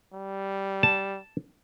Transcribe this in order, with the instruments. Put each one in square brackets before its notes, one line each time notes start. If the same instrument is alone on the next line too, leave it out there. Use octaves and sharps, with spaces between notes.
[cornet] G3
[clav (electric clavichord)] A5